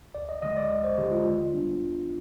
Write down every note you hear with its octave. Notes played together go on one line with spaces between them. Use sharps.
D2 D5
D#5
D3 G#3 D#5
D5
D2 D5
C5
D3 G#3 G4
F4
D#2
D3 G3 B3 D4
D#2